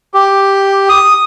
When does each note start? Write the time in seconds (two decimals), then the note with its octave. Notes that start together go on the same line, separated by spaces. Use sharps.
0.14 G4
0.89 D#6